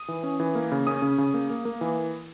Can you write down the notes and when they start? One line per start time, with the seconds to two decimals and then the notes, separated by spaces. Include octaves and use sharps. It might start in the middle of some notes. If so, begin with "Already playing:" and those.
Already playing: D#6
0.08 E3
0.23 C#4
0.40 E3
0.55 A#3
0.72 C#3
0.87 C#4 D#6
1.02 C#3
1.18 C#3
1.34 A#3
1.50 A#3
1.65 A#3
1.81 E3